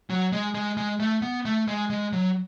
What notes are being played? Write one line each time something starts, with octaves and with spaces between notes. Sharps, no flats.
F#3
G#3
G#3
G#3
A3
B3
A3
G#3
G#3
F#3